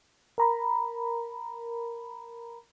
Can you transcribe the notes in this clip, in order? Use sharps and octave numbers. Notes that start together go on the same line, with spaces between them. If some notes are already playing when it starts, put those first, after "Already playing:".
A#4 A#5 B5